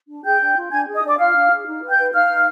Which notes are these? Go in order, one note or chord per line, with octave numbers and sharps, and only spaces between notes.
D4
G#4 G5 G6
D4
F4
D4 G#5 G#6
G#4
D#5 D#6
D4 D5 D6
F4 F5 F6
D4
G#4
D#4
B4
G5 G6
B4
D#4 F5 F6
D#4